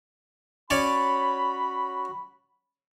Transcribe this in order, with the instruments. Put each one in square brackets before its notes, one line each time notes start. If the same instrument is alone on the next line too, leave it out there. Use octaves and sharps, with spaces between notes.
[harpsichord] C#4 C#5 D5 [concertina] F#4 [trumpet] B5